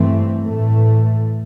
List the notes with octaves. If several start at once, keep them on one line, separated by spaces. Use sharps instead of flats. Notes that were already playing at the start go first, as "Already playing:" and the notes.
Already playing: G2 E3 A3 C4
A2 E3 A3